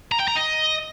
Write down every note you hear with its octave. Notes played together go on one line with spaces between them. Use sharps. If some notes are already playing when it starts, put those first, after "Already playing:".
A#5
G5
A#5
D#5